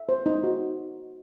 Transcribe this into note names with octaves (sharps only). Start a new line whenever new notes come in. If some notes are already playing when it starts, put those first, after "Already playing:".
Already playing: E5
C5
D#4
F#4